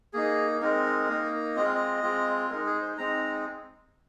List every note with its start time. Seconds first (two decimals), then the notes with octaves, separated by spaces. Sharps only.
0.13 A#3 D#4 G#4
0.61 G#3 C4 D#4 A#4
1.09 A#3 D#4
1.56 G#3 C4 F4 D#5
1.65 F5
1.75 D#5
2.03 G#3 C4 F4
2.50 G#3 D#4 A#4
2.66 G#4
2.81 C5
2.98 G#3 C4 D#4 A#5